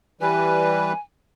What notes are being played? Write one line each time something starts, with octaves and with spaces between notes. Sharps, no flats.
E3 G3 B4 G#5